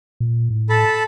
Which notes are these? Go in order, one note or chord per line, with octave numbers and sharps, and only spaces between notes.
A#2
A2
A4 A5 B5